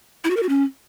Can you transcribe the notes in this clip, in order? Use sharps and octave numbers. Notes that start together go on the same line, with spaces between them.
E4
F#4
A#4
F#4
C#4